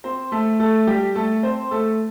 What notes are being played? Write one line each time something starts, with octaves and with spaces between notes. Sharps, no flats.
C4 C5
A3 A4
A3 A4
G3 G4
A3 A4
C4 C5
A3 A4